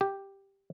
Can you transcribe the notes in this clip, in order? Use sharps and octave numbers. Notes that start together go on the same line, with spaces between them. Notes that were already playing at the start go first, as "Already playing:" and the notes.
G4